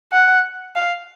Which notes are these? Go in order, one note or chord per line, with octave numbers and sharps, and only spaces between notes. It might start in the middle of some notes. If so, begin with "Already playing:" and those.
F#5
F5